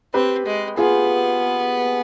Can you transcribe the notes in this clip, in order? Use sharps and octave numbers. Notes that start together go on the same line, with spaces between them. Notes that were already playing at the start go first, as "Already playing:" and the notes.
C4 G4 B4
G#3
B3 F4 G#4